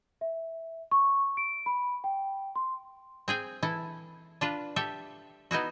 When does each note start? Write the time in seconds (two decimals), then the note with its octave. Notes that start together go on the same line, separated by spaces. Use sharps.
0.21 E5
0.92 C#6
1.37 D7
1.66 B5
2.04 G5
2.56 C6
3.28 C4 G#4 G5 G#5
3.63 E3 E4 A4
4.41 D4 F4 B4
4.76 G4 A4 E5
5.51 B3 D#4 E4 F#4